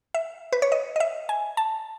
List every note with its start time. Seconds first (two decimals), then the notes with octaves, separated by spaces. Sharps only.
0.14 E5
0.53 B4
0.62 C#5
0.72 D#5
0.96 D#5
1.00 E5
1.29 G#5
1.57 A5